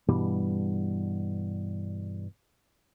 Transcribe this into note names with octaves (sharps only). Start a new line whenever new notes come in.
G2 B2 E3 G3